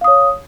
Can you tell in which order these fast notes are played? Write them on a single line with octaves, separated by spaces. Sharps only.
F5 D#6 C#5